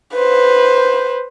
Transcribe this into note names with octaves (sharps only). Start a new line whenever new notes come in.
B4 C5